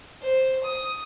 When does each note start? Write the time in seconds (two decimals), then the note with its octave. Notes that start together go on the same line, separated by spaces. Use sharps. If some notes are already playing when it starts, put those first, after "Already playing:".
0.22 C5
0.64 D#6